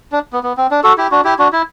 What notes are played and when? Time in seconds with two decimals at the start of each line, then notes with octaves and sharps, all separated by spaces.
0.12 D4
0.33 B3
0.43 B3
0.57 C4
0.71 D4
0.84 F#4 A4
0.98 E4 G4
1.11 D4 F#4
1.24 E4 G4
1.39 D4 F#4
1.53 E4